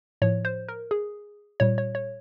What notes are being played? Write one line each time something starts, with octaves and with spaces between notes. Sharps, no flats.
A2 F3 C#5
C5
A#4
G#4
A#2 G3 C#5
C#5
C#5